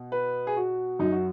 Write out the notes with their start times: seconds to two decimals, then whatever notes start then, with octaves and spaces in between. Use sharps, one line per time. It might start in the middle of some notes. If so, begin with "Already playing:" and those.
Already playing: B2
0.12 B4
0.47 G#4
0.56 F#4
0.99 F#2 F#3 D#4
1.12 F#4